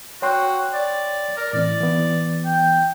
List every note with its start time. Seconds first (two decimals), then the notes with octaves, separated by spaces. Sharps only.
0.22 F#4 C#5 G5 C6
0.73 D5
1.37 A#4
1.53 A2 E3 C4 D5
1.80 E3 B3
2.45 G5